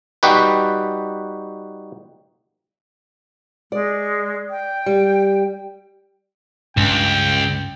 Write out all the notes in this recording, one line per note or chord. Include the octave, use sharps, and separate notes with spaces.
G3 D#4 F#4 G4 B4
G#3 D5
G5
G3
C#2 G2 C#4 G5